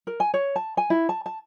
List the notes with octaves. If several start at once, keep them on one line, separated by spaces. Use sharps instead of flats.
A#4
G#5
C#5
A5
G#5
E4
A5
A5